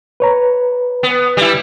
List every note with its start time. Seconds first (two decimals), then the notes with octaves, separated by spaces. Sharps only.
0.20 B4 C#5 A#5
1.03 B3
1.37 G3 E4